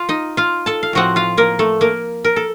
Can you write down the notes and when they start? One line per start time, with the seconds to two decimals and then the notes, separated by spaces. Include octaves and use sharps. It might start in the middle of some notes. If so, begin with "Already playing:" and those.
Already playing: F4 F5
0.09 D#4 D#5
0.37 F4 F5
0.66 A4 A5
0.83 F5
0.93 A2 F3 C4 F#4 F#5
1.16 F4 F5
1.37 A#3 A#4
1.59 A3 A4
1.81 A#3 A#4
2.24 A#4
2.36 A4